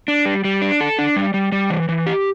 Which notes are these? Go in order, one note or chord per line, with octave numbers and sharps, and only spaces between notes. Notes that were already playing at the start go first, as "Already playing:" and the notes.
D4
G3
G3
D4
A4
D4
G3
G3
G3
E3
E3
G4